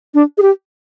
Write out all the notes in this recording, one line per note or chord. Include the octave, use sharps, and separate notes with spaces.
D4
G#4
G4